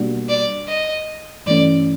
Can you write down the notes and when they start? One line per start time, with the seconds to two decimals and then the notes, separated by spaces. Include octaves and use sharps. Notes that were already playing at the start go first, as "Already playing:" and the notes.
Already playing: B2 G3 A#3 D4 F#4
0.29 D5
0.68 D#5
1.46 G2 E3 A3 C#4 D5